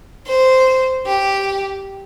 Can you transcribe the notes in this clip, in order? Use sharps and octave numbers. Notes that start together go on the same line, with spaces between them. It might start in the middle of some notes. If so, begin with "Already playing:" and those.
C5
G4